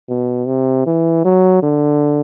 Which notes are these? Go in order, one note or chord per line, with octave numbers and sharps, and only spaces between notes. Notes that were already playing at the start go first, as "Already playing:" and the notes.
B2
C3
E3
F#3
D3